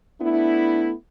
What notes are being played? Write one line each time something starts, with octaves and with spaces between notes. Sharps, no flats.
A3 B3 D4 E4